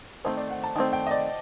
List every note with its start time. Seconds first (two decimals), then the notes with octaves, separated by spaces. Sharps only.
0.24 D#3 A3 C4 C5
0.37 D5
0.50 F#5
0.64 A5
0.76 D#3 A3 C4 G5
0.93 G5
1.07 D#5
1.11 D5